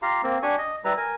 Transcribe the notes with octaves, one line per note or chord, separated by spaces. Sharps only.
F4 G4 F5 A#5
A#3 C4
D4 G4 G#5 C#6
D#5
G3 E4 B4 A#5
A#4 G#5